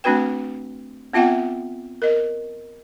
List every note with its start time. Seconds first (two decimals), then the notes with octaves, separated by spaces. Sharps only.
0.04 A3 C4 D4 F#4 B4 G5
1.13 B3 C4 F4 E5 F#5 G5
2.02 A#4 D#5